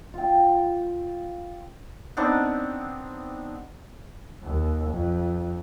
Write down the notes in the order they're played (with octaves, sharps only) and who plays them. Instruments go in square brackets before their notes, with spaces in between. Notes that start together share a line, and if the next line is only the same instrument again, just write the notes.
[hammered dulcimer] F4 G5
[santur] B3 C4 D4 D#4
[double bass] D#2
F2